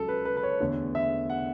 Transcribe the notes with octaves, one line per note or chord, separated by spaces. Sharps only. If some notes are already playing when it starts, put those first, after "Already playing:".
Already playing: C#2 C#3 F#3 A4
B4
B4
B4
C#5
E2 D3 A3
E5
F#5